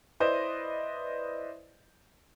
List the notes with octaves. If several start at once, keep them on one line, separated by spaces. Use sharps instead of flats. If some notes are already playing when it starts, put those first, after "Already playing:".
E4 B4 C5 D5 D#5